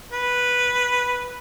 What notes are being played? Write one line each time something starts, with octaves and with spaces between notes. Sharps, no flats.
B4